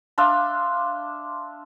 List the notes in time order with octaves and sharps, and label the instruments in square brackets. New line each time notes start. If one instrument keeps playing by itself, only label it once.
[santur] D4 E5 F5 C6